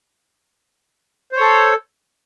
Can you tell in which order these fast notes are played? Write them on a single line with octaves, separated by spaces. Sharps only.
C5 C#5 A4